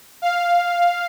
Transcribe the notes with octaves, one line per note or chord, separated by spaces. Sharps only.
F5